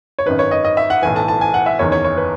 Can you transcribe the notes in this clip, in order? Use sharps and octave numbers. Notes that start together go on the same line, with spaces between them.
C#5
G#1 F#2 D#3 B4
C#5
D#5
D#5
E5
F#5
B1 A2 E3 G#5
A5
A5
G#5
F#5
E5
F#1 E2 D#3 C#5
C#5
C#5
B4